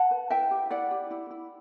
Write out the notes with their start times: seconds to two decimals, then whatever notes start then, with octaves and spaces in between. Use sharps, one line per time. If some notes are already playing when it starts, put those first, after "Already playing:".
Already playing: F#5 A5
0.11 B4
0.30 E4 E5 G5
0.51 G4
0.71 E4 D5 F#5
0.91 G4
1.11 E4
1.31 E4